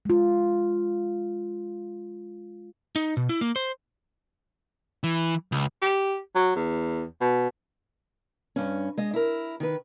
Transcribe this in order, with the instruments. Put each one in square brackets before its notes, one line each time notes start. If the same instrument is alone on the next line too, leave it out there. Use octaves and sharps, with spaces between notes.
[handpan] G#3 F4
[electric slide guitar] D#4
B2
E4
A#3
C5
[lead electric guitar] E3
C#2
[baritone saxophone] G4
F#3
E2
B2
[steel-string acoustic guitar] G2 C#4
G#3 D#5
E4 A#4
D#3 B4